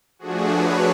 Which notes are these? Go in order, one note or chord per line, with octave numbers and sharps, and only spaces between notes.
F3 A3 D4 F#4 G#4
B4 C#5